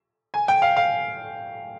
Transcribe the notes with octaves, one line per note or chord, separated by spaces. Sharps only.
G#5
G5
F5
F5